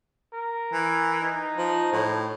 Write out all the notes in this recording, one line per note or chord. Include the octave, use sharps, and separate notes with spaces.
A#4
E3
D#4
F3
A2